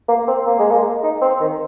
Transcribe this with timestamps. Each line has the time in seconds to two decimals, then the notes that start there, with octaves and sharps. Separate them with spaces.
0.08 A#3
0.27 C4
0.46 A#3
0.59 G#3
0.71 A#3
1.03 D#4
1.21 C4
1.40 D#3